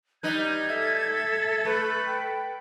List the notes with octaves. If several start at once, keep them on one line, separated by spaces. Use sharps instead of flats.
G3 D#4 B4 G#6
A4 E5
A3 B4
G5